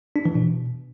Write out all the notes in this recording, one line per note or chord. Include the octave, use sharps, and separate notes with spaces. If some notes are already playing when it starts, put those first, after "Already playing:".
D4
E3
B2